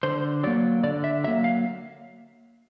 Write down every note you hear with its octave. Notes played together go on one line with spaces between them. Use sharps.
D3 C5
F#3 A#3 D5
D3 D5
E5
F#3 A#3 E5
F5